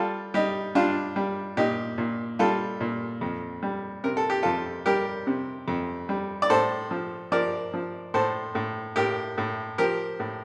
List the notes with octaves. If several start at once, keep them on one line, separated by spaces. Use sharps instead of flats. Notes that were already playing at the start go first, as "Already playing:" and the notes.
Already playing: G3 F4 A4
G3 D#4 G4
G3 D4 F4
G3
A#2 D#4 G4
A#2
G3 F4 A4
A#2
F2
G3
C3 A#4
A4
G4
F2 F4 A4
G3 G4 A#4
C3
F2
G3
D5
A2 A4 C5
F3
F3 A#4 D5
F3
A2 A4 C5
A2
A2 G4 A#4
A2
F3 G4 A#4
A2